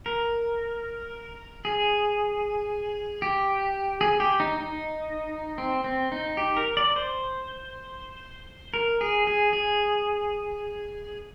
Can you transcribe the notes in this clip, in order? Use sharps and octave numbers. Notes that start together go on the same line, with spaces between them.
A#4
G#4
G4
G#4
G4
D#4
D#4
C4
C4
D#4
G4
A#4
D5
C5
A#4
G#4
G#4
G#4